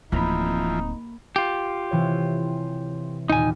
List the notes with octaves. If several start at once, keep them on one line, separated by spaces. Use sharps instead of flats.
D1 E3 F3 A#3 C4 D#4 A#5 B5
F4 G4
C3 E3 C#5
D#2 A#2 D#4 G#5